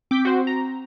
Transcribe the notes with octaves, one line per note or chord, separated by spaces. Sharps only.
C4 D6 G6 B6
F#4 C5
A#5